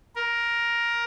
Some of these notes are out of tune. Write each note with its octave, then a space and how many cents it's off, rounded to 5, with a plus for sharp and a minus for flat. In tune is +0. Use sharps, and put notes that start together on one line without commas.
A#4 +10